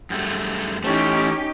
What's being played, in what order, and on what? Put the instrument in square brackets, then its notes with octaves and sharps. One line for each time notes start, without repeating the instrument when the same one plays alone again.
[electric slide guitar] F#2 G3 A3
[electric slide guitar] E3 A3 [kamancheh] C#4 [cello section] D#4 G4